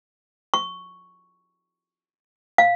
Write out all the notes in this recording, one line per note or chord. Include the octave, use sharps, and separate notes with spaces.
C#6
F5